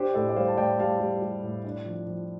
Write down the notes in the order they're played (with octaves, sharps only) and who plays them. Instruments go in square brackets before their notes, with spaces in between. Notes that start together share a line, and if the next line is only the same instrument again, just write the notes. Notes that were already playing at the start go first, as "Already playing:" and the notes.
Already playing: [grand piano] D4 G4 C5
A2 A4 D5
D5
G3 C5 F5
A5
A2 D5 G5
G3 F5 A5
G3
G3
A2
D4
F3
F3